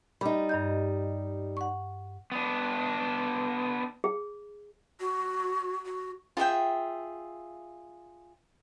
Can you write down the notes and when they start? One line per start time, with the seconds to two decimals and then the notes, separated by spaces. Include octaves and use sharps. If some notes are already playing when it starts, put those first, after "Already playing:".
0.21 G3 D#4 B5 D6
0.49 G2 D#5 G6
1.57 F#5 C#6
2.32 B3 D4
4.04 G#4
5.00 F#4
5.86 F#4
6.37 F4 G#4 E5 G5